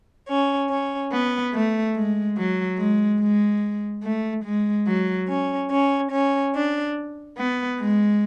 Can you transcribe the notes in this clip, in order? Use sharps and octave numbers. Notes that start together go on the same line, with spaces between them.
C#4
C#4
B3
A3
G#3
F#3
G#3
G#3
A3
G#3
F#3
C#4
C#4
C#4
D4
B3
G#3